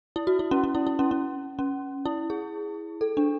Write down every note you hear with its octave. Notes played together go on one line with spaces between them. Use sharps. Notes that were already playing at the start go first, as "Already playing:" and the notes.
E4
F#4
E4
C#4
C#4
E4
E4
C#4
C#4
C#4
E4
G#4
A4
D4